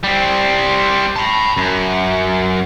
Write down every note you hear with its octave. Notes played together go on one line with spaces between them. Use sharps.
G3 C4
A5 B5
F#2